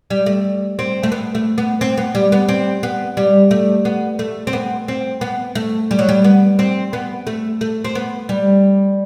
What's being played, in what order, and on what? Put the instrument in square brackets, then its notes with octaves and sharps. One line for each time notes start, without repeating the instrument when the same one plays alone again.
[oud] G3
A3
C4
A3
B3
A3
B3
C4
B3
G3
B3
C4
B3
G3
A3
B3
A3
C4
B3
C4
B3
A3
G3
F#3
G3
B3
C4
B3
A3
A3
C4
B3
G3